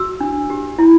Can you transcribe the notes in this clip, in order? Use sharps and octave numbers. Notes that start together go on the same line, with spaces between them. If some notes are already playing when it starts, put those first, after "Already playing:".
Already playing: F#4 E6
D4
G4
E4